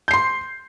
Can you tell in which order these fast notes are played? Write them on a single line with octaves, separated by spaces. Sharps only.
G6 C7 C6